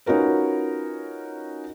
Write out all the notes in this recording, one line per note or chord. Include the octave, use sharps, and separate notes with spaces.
C#4 D#4 F4 F#4 A#4 B4